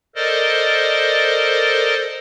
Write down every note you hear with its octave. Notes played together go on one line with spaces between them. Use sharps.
A4 A#4 C5 D5 D#5